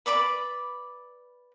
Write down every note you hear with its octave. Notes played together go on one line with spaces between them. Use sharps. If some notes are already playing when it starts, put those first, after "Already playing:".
B4 D5 B5 D6